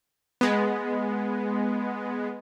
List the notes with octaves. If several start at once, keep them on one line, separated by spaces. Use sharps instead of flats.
G#3 B3